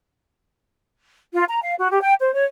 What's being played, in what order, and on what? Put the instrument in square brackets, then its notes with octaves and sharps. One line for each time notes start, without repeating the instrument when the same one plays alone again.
[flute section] F4
A#5
F5
F#4
G4
G5
C5
C#5